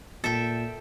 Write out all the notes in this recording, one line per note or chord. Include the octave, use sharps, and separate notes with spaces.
A#2 A4 E5 G5